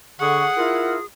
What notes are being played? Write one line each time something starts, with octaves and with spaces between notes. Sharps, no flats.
D3 G#4 F#5 C#6
E4 F4 A#4